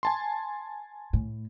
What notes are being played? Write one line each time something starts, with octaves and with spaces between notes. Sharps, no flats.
G#5 A5 C6
A2